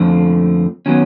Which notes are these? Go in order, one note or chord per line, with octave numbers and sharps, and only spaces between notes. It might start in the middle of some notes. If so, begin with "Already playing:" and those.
Already playing: F2 D3 F3 A3 C4
D#3 F#3 B3 C#4